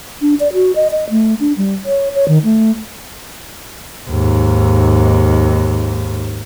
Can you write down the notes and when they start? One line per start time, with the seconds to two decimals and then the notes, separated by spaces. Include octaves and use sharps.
0.21 D4
0.40 D5
0.53 F#4
0.76 D#5
0.91 D#5
1.10 A3
1.40 D4
1.57 G3
1.85 C#5
2.15 C#5
2.28 D#3
2.44 A3
4.10 D#2 G#2